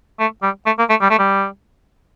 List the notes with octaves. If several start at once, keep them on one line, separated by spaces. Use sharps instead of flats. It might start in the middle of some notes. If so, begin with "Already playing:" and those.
A3
G3
A3
A#3
A3
G3
A3
G3